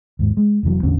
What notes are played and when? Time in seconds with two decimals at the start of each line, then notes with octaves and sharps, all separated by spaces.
0.19 D#2 G#2
0.37 G#3
0.63 F1 F2 E3 F#3
0.83 A1 E2 D3 C#4